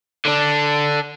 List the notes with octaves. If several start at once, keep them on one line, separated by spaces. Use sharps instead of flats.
D3 D4